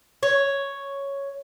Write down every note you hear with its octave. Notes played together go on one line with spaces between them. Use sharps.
C#5